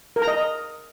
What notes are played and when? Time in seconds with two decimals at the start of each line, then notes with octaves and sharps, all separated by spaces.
0.16 A#4
0.22 A#5
0.28 D#5